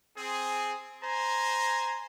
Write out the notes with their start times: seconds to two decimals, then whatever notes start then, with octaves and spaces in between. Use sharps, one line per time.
0.17 C4 G#4
1.04 C5 G#5 A#5